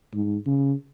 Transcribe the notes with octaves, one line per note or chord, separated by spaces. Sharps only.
G#2
C#3